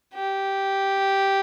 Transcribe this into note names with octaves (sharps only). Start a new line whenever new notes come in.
G4